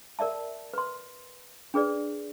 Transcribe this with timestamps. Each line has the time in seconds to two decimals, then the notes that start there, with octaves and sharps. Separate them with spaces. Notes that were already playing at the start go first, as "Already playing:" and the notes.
0.19 A#4 D5 E5 A5
0.74 B4 C6
1.74 D4 G#4 B4 D5